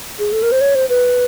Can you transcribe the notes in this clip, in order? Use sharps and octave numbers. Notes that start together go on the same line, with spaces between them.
G#4
A4
A#4
C5
C#5
C5
B4